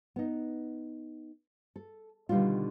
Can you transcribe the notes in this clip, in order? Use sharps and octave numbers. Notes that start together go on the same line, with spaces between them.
B3 D#4
A4
B2 D3 D#3 G3 G#3 F4